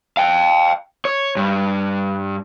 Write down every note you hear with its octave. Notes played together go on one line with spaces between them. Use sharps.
F5 G5
C#5
G2